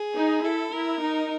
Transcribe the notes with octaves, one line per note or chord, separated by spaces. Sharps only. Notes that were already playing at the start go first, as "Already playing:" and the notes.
Already playing: G#4
D#4
E4 A4
E4 A#4
D#4